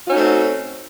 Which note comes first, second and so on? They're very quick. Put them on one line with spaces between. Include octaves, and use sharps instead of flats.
F#4 C#4 D#4 A3 C4